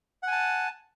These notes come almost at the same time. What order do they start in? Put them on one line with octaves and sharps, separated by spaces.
F#5 G#5 A5